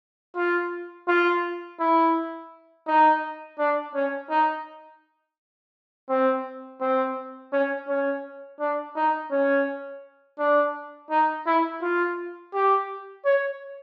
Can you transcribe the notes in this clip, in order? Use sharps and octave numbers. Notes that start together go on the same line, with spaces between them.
F4
F4
E4
D#4
D4
C#4
D#4
C4
C4
C#4
C#4
D4
D#4
C#4
D4
D#4
E4
F4
G4
C#5